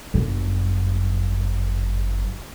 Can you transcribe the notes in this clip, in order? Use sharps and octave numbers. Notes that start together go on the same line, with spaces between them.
G1 F#2